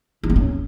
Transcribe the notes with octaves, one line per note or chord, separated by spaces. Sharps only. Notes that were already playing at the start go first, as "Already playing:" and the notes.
E4
C4
C#4